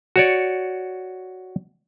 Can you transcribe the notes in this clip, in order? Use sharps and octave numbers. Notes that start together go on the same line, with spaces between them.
F#4 C#5 D5